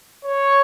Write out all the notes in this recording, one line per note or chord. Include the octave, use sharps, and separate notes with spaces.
C#5